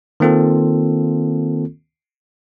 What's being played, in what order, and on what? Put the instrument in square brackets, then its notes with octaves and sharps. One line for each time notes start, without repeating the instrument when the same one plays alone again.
[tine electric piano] D#3 A#3 C4 F4 A4